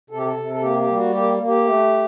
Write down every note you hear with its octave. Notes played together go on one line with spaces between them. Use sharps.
C3 A4
G4
A4
C3
A4
A#3 G4
G4
G3
F#4
A#3 G4
A#3
G4
A3